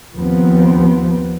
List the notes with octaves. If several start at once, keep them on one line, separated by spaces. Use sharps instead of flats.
D#2 F3 B3 C4